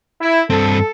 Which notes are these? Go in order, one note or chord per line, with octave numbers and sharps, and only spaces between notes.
E4
G2 C4 A4